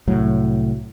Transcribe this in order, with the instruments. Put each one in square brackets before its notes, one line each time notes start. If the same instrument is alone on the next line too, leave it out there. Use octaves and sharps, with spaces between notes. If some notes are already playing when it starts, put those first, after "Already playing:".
[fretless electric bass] C2 A2 F#3